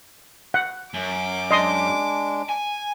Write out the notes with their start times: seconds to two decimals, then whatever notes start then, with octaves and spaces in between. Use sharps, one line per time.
0.54 F#5
0.94 F#2 D6
1.51 G#3 D4 D#5 C6 D#6
2.49 G#5